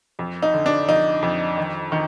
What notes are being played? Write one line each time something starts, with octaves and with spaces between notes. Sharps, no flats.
F2
D#4
D3
D4
F2 D#4
F2
D#3
D#3